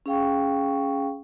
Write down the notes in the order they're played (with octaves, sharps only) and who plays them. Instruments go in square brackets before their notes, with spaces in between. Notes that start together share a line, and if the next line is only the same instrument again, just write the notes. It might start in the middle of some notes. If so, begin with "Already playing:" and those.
[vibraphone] C#4 G#4 F5 G5 C#6